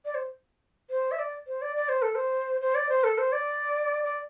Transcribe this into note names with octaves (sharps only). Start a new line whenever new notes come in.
D5
C5
C5
E5
D5
C5
D5
D5
C5
A4
C5
C5
D5
C5
A4
C5
D5
D5